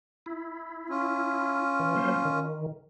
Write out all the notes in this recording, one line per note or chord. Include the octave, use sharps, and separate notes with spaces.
E4
C#4 F4
E3
F#3 A#3 C5
D#3